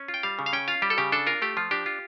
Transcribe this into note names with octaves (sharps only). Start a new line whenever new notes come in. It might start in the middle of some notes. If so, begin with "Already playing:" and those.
Already playing: C#4
F4
G5
G3 F5
C#3
F5
C#4 G5
F4 F5
G3 G4
A4
C#3 G4
D4 A4
F4 A#4
A3 G4
F3 F4
D4 G4
F4